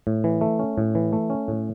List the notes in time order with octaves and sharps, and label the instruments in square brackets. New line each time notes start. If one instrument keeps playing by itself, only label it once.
[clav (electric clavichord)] A2
E3
A3
C#4
A2
E3
A3
C#4
A2